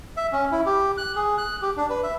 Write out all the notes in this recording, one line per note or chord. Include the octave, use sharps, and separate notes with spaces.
E5
C#4
E4
G4
F#6
G#4
F#6
G4
D4
B4
E5